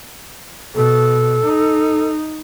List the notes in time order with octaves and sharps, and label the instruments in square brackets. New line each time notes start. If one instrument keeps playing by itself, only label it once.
[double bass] B2 [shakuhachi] A4
[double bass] D#4